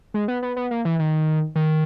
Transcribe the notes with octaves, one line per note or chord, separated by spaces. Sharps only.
G#3
B3
B3
B3
A#3
E3
D#3
D#3